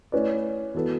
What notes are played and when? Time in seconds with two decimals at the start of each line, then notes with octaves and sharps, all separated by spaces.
0.12 A3 C#4 E4 B4 D5
0.74 E3 B3 F#4 A4